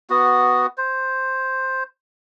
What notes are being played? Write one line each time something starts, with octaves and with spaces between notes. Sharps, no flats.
B3 F#4
C5